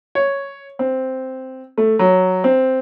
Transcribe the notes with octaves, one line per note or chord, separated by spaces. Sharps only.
C#5
C4
A3
F#3
C4